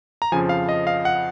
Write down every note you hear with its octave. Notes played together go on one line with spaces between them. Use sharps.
A#5
F2 C#3 F3 G#5
F5
D#5
F5
F#5